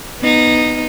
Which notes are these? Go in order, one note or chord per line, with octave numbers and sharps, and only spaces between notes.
B3 D#4